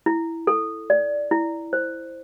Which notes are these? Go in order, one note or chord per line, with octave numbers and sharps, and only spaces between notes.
E4
A4
D5
E4
C5